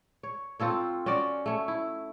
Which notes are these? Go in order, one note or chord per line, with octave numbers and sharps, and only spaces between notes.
C#5
C4 F4 A4 C#5
C#4 F#4 C#5 D5
A3 C#5
E4